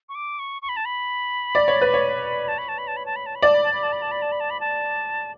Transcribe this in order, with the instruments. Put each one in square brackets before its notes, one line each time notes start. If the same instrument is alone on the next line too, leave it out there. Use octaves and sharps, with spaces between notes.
[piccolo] C#6
D6
C#6
C#6
B5
A5
B5
[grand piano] D5
C#5
B4
C#5
[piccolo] A5
B5
A5
B5
A5
B5
A5
B5
A5
B5
[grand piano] D5 [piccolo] A5
[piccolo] B5
A5
B5
A5
B5
A5
B5
A5
B5
A5
B5
A5